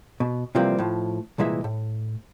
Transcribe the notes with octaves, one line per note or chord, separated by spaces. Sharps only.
B2
C3 E3 F3 G3 A#3 C4
A2 F3
C2 A#2 E3 G#3 E5
A2